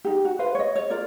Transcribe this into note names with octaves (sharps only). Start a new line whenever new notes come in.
D#4 G4
F#4
B4 C5 F5
C#5 D#5
C#5
F4 A#4 D5